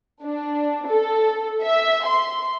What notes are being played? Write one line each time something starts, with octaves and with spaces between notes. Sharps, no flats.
D4
A4
E5
C6